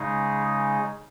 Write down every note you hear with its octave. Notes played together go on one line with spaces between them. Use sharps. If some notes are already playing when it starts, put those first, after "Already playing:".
Already playing: C#3 G#3 D#4 G#4